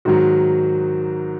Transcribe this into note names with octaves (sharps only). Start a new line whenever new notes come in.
G#2 D#3 F#3 F#4